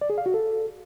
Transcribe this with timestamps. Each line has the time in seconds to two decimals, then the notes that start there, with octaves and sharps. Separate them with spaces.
0.01 D5
0.10 G#4
0.18 F5
0.26 F#4
0.34 A4